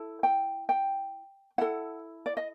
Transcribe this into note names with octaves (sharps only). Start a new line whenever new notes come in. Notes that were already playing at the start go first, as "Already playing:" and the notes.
Already playing: E4 A4
G5
G5
E4 A4 F#5
D5
D#5